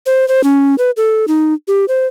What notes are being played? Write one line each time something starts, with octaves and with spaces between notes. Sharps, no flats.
C5
C5
C#4
B4
A4
D#4
G4
C5